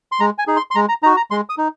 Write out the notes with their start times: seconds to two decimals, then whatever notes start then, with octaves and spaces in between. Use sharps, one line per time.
0.12 C6
0.20 G#3 A#5
0.38 G#5
0.47 D#4 G#4
0.57 C6
0.71 C6
0.75 G#3 A#5
0.89 A#5
1.03 D#4 F#4 A#5
1.17 A#5
1.31 G#3 C6
1.49 D#6
1.58 D#4